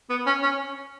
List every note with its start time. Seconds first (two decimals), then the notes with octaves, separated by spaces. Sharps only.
0.10 B3
0.26 C#4
0.42 C#4